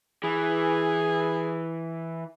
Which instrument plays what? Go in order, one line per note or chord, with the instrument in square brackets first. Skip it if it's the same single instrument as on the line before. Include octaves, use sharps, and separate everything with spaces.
[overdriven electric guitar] E3 [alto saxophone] G#4